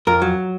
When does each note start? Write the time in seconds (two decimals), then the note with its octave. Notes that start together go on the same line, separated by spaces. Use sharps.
0.07 F2 A#4
0.22 F#3